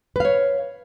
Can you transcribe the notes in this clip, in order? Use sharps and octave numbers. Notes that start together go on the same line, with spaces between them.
B4 C#5 F5